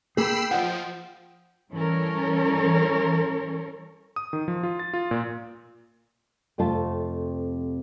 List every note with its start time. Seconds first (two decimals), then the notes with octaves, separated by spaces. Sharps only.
0.17 A#3 G#4 G5 B5 E6 C7
0.51 F3 D#5 F#5
1.72 E3 G3 C#4 A4 A#4 C#5
4.16 D#6
4.33 D#3
4.48 F3
4.63 F4
4.79 A6
4.94 F4
5.11 A#2
6.58 F2 C3 A3 F4 A5